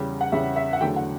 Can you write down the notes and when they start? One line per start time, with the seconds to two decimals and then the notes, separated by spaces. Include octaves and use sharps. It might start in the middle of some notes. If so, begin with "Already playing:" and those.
Already playing: E2 C#3 G3
0.21 F#5
0.32 E2 C#3 G3 E5
0.56 E5
0.73 F#5
0.81 E2 D3 F#3 A3 G5
0.96 F#5